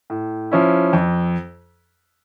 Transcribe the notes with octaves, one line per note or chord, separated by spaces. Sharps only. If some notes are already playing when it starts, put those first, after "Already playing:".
A2
F3 C#4 E4
F2